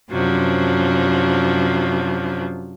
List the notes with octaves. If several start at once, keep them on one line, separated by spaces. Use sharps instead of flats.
F#2 C3 F3 F#3 D4